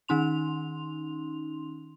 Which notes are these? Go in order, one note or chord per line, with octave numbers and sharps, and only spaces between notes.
D#3 C#4 D#4 C6 F7